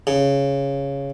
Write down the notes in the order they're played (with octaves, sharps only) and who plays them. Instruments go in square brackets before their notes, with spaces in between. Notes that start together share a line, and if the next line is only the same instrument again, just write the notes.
[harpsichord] C#3